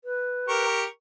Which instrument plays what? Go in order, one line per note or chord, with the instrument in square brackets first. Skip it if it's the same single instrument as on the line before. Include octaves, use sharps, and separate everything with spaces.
[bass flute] B4
[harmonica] G4 A#4 C#6